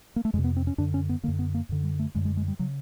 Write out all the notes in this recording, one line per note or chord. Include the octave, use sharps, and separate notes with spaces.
A#3
A3
F2 C3 G#3
B3
C4
C#4
F#2 D3 D4
C#4
B3
F#2 D3 A#3
B3
A#3
F#2 D3
G3
A3
F#2 D3 G#3
G#3
G#3
G3
C#3 F#3